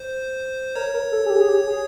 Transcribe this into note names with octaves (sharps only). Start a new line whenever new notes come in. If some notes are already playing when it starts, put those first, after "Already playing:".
Already playing: C5
A#4 C#5
A#4
A4
G#4
G4
G#4
G4
G#4